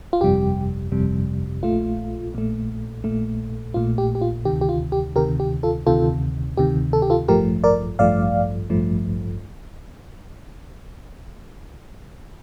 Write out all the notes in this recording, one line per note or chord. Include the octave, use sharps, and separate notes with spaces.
F4
G1 F2 C3 G3 G4
G1 F2 C3 G3
A#1 A#2 A3 F4
A#1 A#2 A3
A#1 A#2 A3
A#1 A#2 A3 F4
G4
G4
F4
D2 C3 D#3 G4
G4
F4
G4
D2 C3 D#3 G4 A#4
G4
F4 A4
D2 C3 D#3 F4 A4
D2 C3 D#3 G4
A4
G4
F4 A4
A1 G2 F3 A3 G4 A#4
A#4 D5
A1 G2 F3 A3 D5 F5
A1 G2 F3 A3